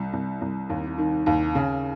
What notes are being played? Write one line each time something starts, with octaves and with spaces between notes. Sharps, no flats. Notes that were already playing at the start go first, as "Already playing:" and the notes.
Already playing: C2
C2
C2
D#2
D#3
D#2
C#3